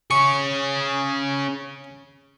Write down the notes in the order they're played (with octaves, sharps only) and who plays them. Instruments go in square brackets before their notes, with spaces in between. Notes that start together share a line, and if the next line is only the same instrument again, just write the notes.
[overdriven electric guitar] C#4 G#4 [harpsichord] C#6